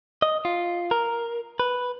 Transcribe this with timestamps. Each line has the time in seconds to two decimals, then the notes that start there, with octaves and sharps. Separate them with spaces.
0.22 D#5
0.45 F4
0.91 A#4
1.60 B4